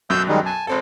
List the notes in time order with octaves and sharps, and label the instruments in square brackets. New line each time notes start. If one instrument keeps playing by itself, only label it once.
[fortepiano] B1 F#2 F#3 [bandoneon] E6 G6
[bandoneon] D#3 G3 G#3
G#5 A5
[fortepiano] G#1 C4 A4